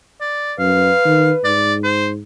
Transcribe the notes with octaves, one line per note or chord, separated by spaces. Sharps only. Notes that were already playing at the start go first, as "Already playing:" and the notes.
D5
F#2 B4 F5
D#3
G#2 D5
C5